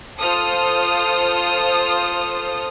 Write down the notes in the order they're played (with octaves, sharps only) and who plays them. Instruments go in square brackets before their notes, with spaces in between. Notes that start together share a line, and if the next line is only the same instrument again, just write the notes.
[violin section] F4 A4 C5 D#6 F6